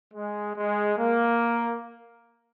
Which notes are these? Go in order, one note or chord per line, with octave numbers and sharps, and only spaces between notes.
G#3
G#3
A#3